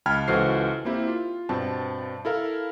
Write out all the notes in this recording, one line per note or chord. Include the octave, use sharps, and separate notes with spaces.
C#2 G5 A5 B5 F6 G#6
C#2 E3 F#4 A4 C5 C7
A#3 C4 E4 G4
F4
G2 B2 C4 A5
E4 A4 A#4 F5